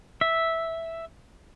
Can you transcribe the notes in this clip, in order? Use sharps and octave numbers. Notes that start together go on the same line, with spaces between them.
E5